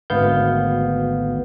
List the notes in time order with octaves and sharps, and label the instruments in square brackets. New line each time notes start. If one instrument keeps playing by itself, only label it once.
[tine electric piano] G#1 D2 B3 F5 G6